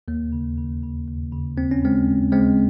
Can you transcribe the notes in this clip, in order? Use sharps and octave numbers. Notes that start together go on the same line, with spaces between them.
D#2 A#3
C#3
C#3
C#3
D#2
C#3
D#2 C4
C#4
C#3 G#3 C4
D#2
C#3 G#3 C4